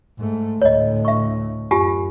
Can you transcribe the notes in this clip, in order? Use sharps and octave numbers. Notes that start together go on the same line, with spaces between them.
G#2 A3
D2 A2 C#5 D#5
E5 C#6
F#2 F4 G4 G#5